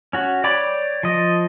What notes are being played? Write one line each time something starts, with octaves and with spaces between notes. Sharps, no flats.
C#4 F#4
C#5 D5 G5 B5 D6
F3 D#5